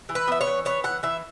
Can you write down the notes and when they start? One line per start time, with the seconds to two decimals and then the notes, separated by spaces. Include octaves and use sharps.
0.09 E3
0.15 B4
0.28 B3 E5
0.41 C#5
0.47 E3
0.65 B3 C#5
0.84 E3 F#5
1.03 E3 E5